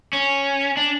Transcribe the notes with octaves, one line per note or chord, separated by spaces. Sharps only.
C#4
D4